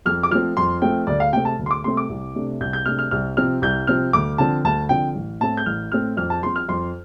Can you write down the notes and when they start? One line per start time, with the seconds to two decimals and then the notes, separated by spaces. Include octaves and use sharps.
0.06 F2 F6
0.23 D6
0.31 F3 A3 C4 F6
0.57 F2 C6
0.82 F3 A3 C4 G5
1.07 D2 D5
1.20 F5
1.32 C3 A3 C4 G5
1.45 A5
1.59 D2
1.66 C6
1.71 D6
1.84 C3 A3 C4 C6
1.97 D6
2.09 C2
2.35 C3 A3 D4
2.61 C2 G6
2.73 G6
2.85 C3 A3 D4 F6
2.99 F6
3.11 C2 F6
3.37 C3 F3 C4 F6
3.62 C2 G6
3.87 C3 F3 C4 F6
4.13 D2 D6
4.38 D3 F3 C4 A5
4.64 D2 A5
4.89 D3 F3 C4 G5
5.15 A1
5.40 A2 A3 C4 A5
5.57 G6
5.66 A1 F6
5.92 A2 A3 C4 F6
6.17 F2 F6
6.30 A5
6.42 F3 C4 C6
6.56 F6
6.69 F2 C6